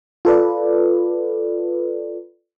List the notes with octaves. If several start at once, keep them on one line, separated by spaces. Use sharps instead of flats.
F4 A4 B4 D5